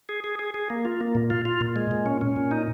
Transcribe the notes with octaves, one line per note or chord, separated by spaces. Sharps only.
G#4
G#4
G#4
G#4
A#3
F4
A#3
A#2
F4
F4
A#2
G#3
A#2
C#4
C#4
A#2
D#4